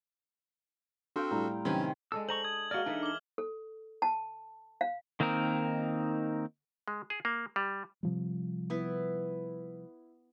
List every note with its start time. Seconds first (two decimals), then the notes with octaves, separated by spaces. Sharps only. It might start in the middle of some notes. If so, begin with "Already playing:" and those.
1.16 C4 D4 F#4 A4 F5 G5
1.31 A2 G3 A#5
1.65 C3 D#3 F#3 C#4 B4 G#5 G#6
2.12 G#3 D4 A4 E6
2.29 C5 A#5 C#6 F#7
2.44 D#6 G#6
2.71 G#3 A#3 F#4 D5 D#5 F6
2.86 E3 D4 D#4 A4 B4 D5
3.03 D6 G7
3.38 A4
4.02 A5
4.81 F5
5.20 D#3 A#3 C4 D#4 A#4
6.88 G#3
7.10 G#4
7.25 A#3
7.56 G3
8.03 C3 F3 G3
8.70 B3 E4 B4